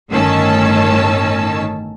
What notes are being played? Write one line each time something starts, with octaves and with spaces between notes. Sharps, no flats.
G1 A2 D#3 C#4 A5 E6